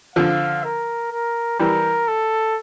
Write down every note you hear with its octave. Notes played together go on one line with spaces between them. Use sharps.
D3 F3 F5
A#4
A#4
E3 G3 A#4
A4